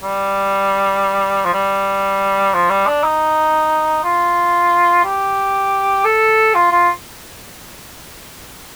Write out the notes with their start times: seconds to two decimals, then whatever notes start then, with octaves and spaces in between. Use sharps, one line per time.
0.03 G3
1.45 F3
1.53 G3
2.53 F3
2.70 G3
2.87 D4
3.04 D#4
4.04 F4
5.04 G4
6.05 A4
6.55 F4
6.72 F4